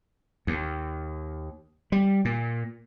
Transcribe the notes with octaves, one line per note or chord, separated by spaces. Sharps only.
D#2
G3
A#2